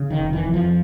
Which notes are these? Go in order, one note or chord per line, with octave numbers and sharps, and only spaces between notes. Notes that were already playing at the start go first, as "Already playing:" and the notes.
Already playing: C#3
D#3
F1
E3
F2
F3